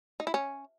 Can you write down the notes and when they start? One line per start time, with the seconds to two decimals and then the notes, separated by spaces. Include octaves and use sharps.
0.20 D#4
0.27 E4
0.34 C#4